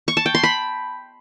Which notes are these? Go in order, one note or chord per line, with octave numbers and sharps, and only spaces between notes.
C#6
A5
G5
C6
B5